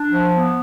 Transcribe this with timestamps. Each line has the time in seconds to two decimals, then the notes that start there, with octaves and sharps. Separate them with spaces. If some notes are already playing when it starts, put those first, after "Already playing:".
Already playing: D4
0.11 F3
0.34 B3